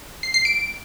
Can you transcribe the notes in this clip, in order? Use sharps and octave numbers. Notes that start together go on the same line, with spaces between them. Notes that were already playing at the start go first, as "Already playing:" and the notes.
C7
C7
D7